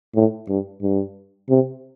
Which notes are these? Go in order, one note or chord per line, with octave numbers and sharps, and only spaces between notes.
A2
G2
G2
C3